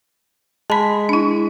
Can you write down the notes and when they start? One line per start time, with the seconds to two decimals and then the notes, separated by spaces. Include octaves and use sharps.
0.70 G#3 A5 B5 B6
1.09 D4 E4